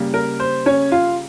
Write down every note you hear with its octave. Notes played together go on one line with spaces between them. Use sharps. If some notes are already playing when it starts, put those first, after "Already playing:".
Already playing: C#3 G3 A#3
A#4
C5
C#4 C#5
F4 F5